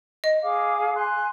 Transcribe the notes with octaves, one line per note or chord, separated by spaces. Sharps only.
D#5
G#4 F5 D6
G#5 C6 F#6